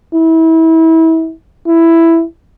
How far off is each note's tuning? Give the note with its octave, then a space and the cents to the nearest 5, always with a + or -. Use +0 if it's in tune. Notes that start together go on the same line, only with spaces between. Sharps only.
E4 -30
E4 +5